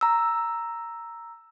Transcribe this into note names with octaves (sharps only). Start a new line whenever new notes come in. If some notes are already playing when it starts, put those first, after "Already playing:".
A#5 E6